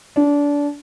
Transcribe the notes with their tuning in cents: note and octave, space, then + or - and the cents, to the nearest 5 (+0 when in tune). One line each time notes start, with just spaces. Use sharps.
D4 -25